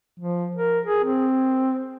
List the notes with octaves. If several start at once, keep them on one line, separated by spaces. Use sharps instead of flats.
F3
A#4
G#4
C4